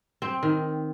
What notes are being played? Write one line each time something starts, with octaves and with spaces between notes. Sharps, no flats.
C4
D#3